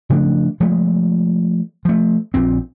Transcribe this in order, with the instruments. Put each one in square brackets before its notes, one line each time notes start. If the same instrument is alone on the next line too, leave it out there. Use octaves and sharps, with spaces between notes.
[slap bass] C#3 F3 A3 D4
F3 G#3 A3
F3 A3
A#1 A#2 C4